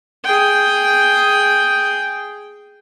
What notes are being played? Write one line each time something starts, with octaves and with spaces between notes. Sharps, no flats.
G#4 G5